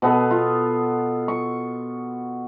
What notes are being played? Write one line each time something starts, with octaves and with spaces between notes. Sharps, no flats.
B2 B3 A4 F5
F4
C#6